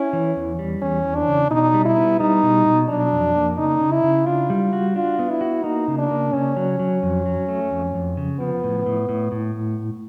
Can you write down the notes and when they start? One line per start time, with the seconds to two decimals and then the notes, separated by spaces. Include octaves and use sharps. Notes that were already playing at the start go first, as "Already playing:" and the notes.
Already playing: C#4 E4
0.13 E3
0.36 E2
0.59 G3
0.82 E2 C#4
1.04 E3
1.16 D4
1.28 C#3
1.51 B2 D#4
1.74 G3
1.85 E4
1.96 B3
2.20 G3 D#4
2.43 B2
2.66 B2
2.89 F#3 D4
3.12 F2
3.35 A#3
3.58 C#3 D#4
3.81 C#3
3.92 E4
4.04 C#3
4.26 D4 F4
4.50 G3
4.73 F#4
4.96 D4 F4
5.19 B3
5.30 E4
5.41 F#4
5.64 A#3 D#4
5.88 C#3
5.99 D4
6.11 A#3
6.33 C#3 C#4
6.57 F#3
6.79 F#3
7.03 F2
7.26 F#3
7.49 A3
7.71 F2
7.94 F2
8.17 C#3
8.40 F3 B3
8.63 A2
8.86 A2
9.09 A2
9.32 A2